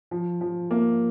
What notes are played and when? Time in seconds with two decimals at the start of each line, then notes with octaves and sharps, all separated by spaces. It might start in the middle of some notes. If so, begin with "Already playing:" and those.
0.11 F3
0.41 F3
0.71 A#3